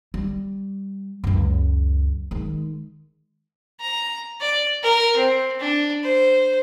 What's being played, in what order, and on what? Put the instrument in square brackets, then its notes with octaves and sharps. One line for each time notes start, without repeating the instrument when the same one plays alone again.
[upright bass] G3
C#2 F#2
D#3 G#3
[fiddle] A#5
D5
A#4
C4
D4
C5